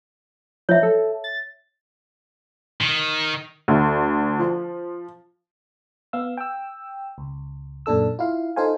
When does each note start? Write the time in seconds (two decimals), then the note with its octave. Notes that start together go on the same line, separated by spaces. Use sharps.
0.69 F3 C#5 E5
0.83 A4
1.24 A6
2.81 D#3
3.68 D2
4.39 F3
6.13 B3 F5 E6
6.37 G5 E6
7.18 C#2
7.86 F#2 A#2 D4 A4 E6
8.19 E4 F4 F5
8.56 D#4 F4 A4 C5 F5 G#5